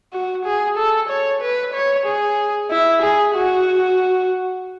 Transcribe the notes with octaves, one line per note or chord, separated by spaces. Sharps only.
F#4
G#4
A4
C#5
B4
C#5
G#4
E4
G#4
F#4